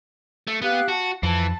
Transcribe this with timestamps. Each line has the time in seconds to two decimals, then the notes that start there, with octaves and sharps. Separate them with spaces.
0.47 A3
0.62 B3 G4 F5 F#6
0.88 F#4 A5
1.23 F2 E3 A5